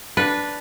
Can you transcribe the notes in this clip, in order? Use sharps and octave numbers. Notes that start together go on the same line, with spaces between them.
D4 B4